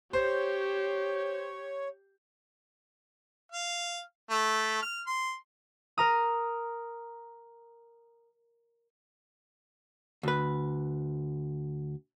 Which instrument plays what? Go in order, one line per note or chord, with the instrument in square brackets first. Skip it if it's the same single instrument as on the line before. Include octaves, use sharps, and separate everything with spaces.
[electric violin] G4 [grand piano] C5 [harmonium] C#5
[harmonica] F5
A3
F6
C6
[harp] A#4 A#5 D#6
[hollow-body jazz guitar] D2 B4